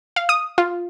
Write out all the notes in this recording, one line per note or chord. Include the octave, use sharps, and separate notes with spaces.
F5
D#6
F4